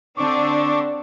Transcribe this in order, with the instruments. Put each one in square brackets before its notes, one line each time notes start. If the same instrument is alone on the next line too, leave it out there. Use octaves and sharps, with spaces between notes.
[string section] D3 C4 D4 [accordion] C#6 D6